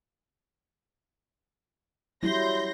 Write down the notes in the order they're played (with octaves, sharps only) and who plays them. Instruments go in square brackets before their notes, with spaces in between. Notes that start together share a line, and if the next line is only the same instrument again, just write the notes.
[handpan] F#3 G3 E4 [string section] C6 G6 A#6